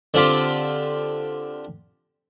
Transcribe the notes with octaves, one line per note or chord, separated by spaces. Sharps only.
D3 C4 F4 G4